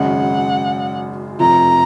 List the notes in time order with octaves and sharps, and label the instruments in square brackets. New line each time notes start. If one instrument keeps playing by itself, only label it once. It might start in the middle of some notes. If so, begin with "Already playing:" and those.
Already playing: [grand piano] G#1 F#2 C#3 G#3 [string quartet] F#5
[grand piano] F1 F2 C3 F3 [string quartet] A#5